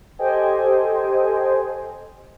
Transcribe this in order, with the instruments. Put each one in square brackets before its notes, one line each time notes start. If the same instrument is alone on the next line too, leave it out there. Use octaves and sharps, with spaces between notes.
[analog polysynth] G4 A4 C5 D#5 G5 G#5